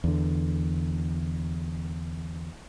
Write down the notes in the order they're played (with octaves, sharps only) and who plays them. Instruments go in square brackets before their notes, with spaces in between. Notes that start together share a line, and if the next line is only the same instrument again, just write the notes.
[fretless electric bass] E2 D3